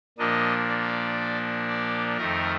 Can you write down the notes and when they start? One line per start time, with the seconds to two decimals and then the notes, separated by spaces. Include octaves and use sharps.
0.18 A#2 F3 A#3 D4 D#5
0.68 D5
1.68 D5
2.17 F2 D#3 A3 A#4